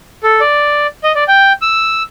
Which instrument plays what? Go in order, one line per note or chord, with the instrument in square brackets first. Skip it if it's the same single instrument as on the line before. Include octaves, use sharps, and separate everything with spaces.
[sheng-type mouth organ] A4
D5
D#5
D5
G5
E6